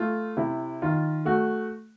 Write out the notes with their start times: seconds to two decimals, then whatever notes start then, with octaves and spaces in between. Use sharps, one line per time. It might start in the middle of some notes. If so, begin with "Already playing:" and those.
Already playing: A3 F4
0.37 C3 E4
0.82 D#3 F4
1.25 A3 F#4